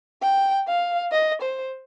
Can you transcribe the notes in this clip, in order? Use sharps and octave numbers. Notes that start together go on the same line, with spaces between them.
G5
F5
D#5
C5